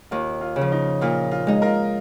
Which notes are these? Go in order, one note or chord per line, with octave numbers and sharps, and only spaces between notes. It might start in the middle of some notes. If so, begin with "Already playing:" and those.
D#2 F4
F4
C#3
F3
D#4
A#2 F4
F4
G#3 D#4
F4 A#4